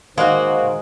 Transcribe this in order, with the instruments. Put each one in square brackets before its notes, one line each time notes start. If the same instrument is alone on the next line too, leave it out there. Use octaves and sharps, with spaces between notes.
[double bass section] D#3 [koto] G#3 [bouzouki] A#3 F#4 [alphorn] C5